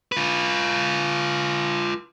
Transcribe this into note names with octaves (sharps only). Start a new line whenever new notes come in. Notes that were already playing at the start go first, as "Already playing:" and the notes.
F4 B4